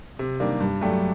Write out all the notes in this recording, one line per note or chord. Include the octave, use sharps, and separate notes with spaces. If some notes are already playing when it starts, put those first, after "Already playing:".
C3
D#3 G3 A#3 D4
G2
F#3 A3 D4 G4